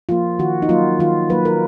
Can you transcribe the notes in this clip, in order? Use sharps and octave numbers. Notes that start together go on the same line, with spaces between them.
F3 A#3 F4
D#3 F#4
D#4
F#3 A#3 F4
D#3 F4
F#3 A#3 B4
A#4